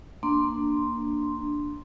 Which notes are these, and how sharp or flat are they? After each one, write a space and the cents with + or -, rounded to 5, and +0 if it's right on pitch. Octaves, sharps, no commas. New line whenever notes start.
A#3 +0 D4 +0 C6 +0